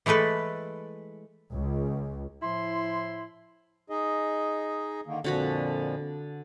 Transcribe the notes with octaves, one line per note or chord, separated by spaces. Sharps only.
E3 G#3 A3 A4 B4
C#2
A2 F3 E4 C6
D#4 G#4 D#5
D3 D#3 A#3
F2 A#2 D3 F3 F#4 B5